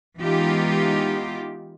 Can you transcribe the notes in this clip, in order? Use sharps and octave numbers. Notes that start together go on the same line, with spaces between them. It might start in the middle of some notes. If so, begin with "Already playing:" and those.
E3 G#3 B3 D#4 F4 G4